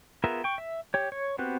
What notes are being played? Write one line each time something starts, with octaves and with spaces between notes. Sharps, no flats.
B3 F4 G#4 A#4 E5
G5 C#6
E5
G4 C#5
C#5
B3 C4 F#4 G4 B4